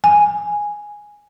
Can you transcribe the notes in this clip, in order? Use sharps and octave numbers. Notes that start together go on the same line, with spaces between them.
G#5